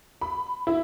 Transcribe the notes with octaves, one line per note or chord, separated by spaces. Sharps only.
B5
E4